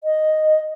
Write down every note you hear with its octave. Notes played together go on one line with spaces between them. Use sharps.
D#5